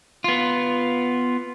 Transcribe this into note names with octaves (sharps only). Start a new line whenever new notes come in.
B3 F4